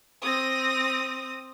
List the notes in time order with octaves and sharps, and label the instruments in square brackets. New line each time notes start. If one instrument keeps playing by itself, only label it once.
[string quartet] C4 D#6 A#6